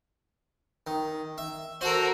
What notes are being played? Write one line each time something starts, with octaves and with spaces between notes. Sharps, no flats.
D#3
E5
F#4 A4 A#4 C5